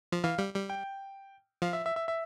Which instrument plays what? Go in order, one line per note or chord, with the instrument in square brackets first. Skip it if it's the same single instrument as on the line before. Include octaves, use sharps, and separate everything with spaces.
[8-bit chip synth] F3
[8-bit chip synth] E3 [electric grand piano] F5
[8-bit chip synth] G3
G3
[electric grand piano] G5
[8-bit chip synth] F3 [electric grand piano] F5
[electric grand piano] E5
E5
E5
E5